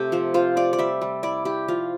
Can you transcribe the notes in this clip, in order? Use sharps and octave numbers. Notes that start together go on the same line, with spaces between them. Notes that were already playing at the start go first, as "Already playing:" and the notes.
Already playing: C3 A3 C4 G4
F3 C5
F4 C5
F4 D5
D5
G3 E5
G3
E4 D5
E4 G4
F3 F4